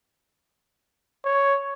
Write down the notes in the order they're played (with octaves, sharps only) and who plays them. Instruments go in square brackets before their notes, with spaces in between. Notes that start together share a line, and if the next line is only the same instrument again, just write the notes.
[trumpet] C#5